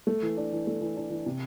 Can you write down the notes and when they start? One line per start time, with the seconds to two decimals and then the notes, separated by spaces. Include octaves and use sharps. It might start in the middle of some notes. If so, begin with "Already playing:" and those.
0.07 A3
0.22 E3
0.37 D4
0.52 E3
0.67 A3
0.81 E3
0.97 D4
1.10 E3
1.26 C3